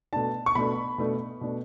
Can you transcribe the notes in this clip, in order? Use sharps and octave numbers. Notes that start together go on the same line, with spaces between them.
B2 A3 D4 A5
C#6
B2 A3 D4 B5
B2 A3 D4
B2 A3 D4